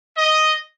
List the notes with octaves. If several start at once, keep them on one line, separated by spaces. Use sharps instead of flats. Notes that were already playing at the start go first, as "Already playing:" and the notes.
D#5